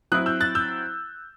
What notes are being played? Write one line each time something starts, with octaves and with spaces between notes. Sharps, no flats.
F#3 C4 E4 D#6 F#6
E6 G6
F#6 A6
E6 G6